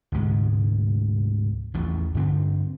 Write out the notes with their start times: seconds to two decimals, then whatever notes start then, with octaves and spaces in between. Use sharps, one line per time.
0.12 D2 G#2 C3 G#3
1.74 A1 E2 E3 F3
2.15 G2 D3 C4